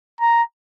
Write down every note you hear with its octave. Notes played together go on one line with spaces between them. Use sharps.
A#5